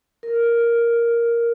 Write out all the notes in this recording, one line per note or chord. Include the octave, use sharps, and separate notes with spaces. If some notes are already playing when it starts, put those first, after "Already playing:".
A#4